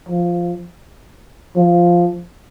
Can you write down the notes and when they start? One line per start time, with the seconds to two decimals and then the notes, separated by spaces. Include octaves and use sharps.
0.09 F3
1.56 F3